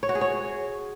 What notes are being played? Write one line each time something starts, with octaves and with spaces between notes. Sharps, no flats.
C#5
F#4
G#4
C#5